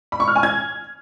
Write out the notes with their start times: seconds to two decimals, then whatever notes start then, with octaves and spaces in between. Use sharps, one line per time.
0.12 B5
0.20 C#6
0.28 F6
0.35 G#5
0.43 G#6